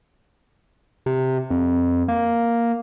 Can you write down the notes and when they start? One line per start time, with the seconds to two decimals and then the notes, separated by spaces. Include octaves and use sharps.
1.06 C3
1.50 F2
2.08 A#3